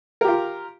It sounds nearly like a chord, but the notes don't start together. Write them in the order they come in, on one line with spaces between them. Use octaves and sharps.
A#4 G4 F4